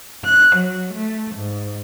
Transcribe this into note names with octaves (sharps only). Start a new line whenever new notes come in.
F#6
F#3
A3
G#2